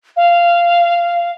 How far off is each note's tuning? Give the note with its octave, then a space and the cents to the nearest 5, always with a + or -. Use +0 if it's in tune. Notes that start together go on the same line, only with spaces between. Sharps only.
F5 -15